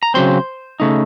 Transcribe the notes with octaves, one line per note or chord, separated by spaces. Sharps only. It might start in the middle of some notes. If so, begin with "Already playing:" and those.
A#5
C#3 F#3 C4 C5 C6
C#3 A3 D#4